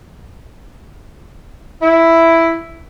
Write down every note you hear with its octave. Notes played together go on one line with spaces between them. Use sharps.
E4